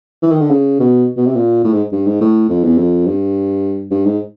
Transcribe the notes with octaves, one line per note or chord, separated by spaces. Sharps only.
E3
D#3
D3
C#3
B2
B2
C3
A#2
A2
G#2
G2
G#2
A2
F2
E2
F2
G2
G2
G#2